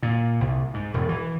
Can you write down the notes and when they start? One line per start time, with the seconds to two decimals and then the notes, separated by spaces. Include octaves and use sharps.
0.03 A#2
0.40 C2
0.74 G#2
0.94 E1
1.09 E3